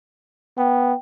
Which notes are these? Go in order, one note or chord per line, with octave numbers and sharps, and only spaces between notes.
B3 G5